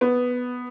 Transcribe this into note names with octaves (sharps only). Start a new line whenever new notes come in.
B3